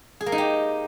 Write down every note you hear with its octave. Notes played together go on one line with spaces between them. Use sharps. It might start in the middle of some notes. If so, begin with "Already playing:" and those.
G#4
A#3
D#4
G4